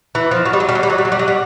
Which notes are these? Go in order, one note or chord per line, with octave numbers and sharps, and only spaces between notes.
E3
F3
F#3
G3
F#3
G3
F#3
G3
F#3
G3
F#3
G3
F#3
G3